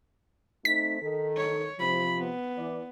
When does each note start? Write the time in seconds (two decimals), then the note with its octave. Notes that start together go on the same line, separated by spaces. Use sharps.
0.65 A3 C4 D#4 B6
1.02 D#3 A4
1.37 C#5
1.79 C3 F3 B5
2.18 B3
2.59 E3 D5